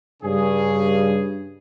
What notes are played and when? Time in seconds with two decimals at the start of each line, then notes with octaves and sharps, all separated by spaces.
0.23 G2 C#3 G#4